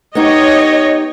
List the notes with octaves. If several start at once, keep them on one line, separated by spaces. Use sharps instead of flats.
B3 D#4 G4 C#5 D#5